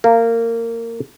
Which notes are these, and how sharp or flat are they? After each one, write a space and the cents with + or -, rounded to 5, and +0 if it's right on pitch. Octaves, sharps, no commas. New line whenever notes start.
A#3 -20